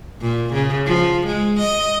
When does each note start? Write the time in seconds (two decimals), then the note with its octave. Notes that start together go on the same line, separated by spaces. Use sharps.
0.22 A#2
0.53 C#3
0.86 F3
1.26 G#3
1.60 D#5